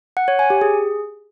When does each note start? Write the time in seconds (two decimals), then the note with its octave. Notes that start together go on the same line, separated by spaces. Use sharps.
0.17 F#5
0.28 C#5
0.39 G#5
0.50 G4
0.62 G#4